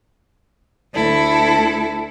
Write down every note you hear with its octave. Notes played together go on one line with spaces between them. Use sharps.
D2 E4 A4